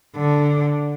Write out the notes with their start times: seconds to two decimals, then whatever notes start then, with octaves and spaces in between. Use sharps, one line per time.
0.17 D3